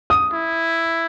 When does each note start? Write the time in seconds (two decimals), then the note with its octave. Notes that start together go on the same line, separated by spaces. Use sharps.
0.10 D#6
0.33 E4